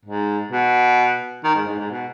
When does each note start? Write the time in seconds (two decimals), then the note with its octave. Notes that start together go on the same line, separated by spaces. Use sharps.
0.05 G#2
0.51 B2
1.44 D#3
1.55 G#2
1.67 G#2
1.79 G#2
1.90 B2